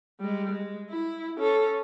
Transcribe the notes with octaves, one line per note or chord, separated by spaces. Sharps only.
G3 G#3
G#3
E4
C#4 A4